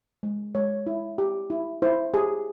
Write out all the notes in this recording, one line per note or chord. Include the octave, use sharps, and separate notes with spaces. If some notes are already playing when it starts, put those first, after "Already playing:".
G#3
G#3 C#5
E4
G4
E4
E4 C5
G4 G#4